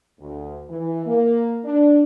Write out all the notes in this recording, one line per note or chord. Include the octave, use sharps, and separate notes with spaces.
D2
E3
A#3
D4